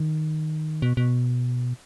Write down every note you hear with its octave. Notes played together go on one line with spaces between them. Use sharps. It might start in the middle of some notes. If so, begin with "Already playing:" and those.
Already playing: D#3
B2
B2